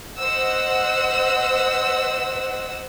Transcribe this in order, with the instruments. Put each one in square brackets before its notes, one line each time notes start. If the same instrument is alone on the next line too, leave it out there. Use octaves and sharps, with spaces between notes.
[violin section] C5 D#5 F#5 E6